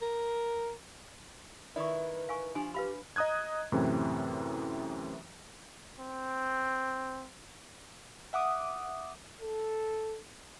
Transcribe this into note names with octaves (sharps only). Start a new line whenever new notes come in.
A#4
D#3 E4 B4 D5 C#6
F5 G#5 C#6
F3 D4 G4 G#5
G4 B4 F5 B5
D#5 A#5 D#6 F#6 G#6
F#2 A2 C3 E3
C4
E5 F#5 D6 D#6
A4